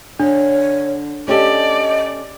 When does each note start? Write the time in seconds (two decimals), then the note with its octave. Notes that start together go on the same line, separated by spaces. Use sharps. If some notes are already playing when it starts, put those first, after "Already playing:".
0.20 D3 D4 C#5
1.28 C#4 G4 A4 D5 D#5